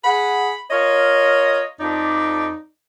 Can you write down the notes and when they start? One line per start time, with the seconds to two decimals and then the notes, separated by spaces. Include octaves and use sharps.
0.04 G#4 F#5 B5
0.70 F4 A#4 C#5 D#5
1.80 F2 D#4 D5